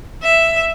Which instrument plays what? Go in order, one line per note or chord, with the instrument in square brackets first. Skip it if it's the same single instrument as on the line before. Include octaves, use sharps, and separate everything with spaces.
[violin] E5